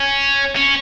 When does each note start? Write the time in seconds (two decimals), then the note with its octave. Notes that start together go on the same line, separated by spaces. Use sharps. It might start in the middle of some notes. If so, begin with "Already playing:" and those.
Already playing: C#4
0.55 C#4